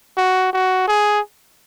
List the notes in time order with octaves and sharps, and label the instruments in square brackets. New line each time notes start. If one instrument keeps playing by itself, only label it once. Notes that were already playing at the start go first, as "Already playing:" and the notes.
[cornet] F#4
F#4
G#4